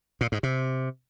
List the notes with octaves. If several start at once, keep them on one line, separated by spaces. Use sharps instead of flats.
A#2
G#2
C3